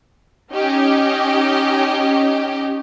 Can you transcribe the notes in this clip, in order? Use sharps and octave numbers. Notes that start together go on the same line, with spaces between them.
C#4 D#4 G4 D#5